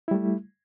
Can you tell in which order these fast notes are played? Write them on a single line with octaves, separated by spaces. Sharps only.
E4 G3 A3